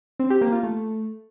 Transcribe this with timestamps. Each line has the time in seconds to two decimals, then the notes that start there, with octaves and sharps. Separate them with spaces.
0.19 C4
0.30 G4
0.41 A#3
0.52 F4
0.63 A3